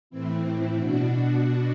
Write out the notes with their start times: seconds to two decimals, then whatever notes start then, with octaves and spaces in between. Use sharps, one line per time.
0.10 A2 E3 C4 E4
0.78 B2 D4 F#4